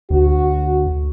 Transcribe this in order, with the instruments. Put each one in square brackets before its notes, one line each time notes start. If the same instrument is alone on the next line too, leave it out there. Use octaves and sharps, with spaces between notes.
[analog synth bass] D2 [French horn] F#4